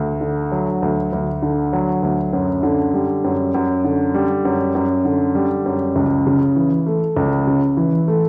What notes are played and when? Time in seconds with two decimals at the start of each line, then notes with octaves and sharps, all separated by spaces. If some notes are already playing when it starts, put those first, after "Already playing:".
Already playing: D2
0.21 D3
0.52 F#3
0.82 D2
1.13 D2
1.42 D3
1.73 F#3
2.03 D2
2.33 F#2
2.63 D3
2.94 G3
3.24 F#2
3.54 F#2
3.84 D3
4.14 G3
4.45 F#2
4.75 F#2
5.05 D3
5.35 G3
5.66 F#2
5.96 C#2
6.27 C#3
6.56 E3
6.86 A3
7.17 C#2
7.47 C#3
7.77 E3
8.08 A3